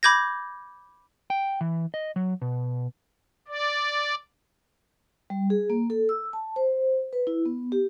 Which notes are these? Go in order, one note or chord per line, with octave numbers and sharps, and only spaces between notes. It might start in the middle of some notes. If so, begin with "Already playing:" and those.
B5 D6 G6 G#6 A#6
G5
E3
D#5
F#3
B2
D5
G3
G#4
A#3
A4
E6
A5
C5
B4
E4
B3
G4